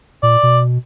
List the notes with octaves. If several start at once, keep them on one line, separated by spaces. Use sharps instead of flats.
A#2 D5
B2